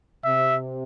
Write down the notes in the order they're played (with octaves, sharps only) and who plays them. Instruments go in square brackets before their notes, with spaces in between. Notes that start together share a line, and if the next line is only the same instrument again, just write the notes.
[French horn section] C3 [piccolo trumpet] E5